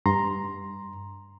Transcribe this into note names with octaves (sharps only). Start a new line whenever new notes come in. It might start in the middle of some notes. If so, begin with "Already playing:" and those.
G2 A#5 C6